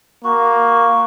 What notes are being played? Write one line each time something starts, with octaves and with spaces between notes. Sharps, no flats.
A#3 F#4